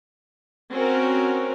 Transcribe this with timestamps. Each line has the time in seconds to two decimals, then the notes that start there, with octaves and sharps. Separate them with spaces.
0.71 C4 C#4 F#4 A#4